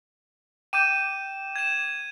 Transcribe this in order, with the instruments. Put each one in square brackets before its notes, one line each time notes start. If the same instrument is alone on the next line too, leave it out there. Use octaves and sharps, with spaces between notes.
[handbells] G5 D6 G6 [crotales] D#7 E7
[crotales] G#6 E7